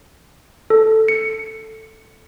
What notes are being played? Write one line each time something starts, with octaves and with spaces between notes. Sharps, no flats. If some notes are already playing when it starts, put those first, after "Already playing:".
A4
C#7